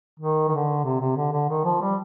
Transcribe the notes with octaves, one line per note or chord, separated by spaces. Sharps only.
D#3
D#3
D3
C3
C3
D3
D3
D#3
F3
G3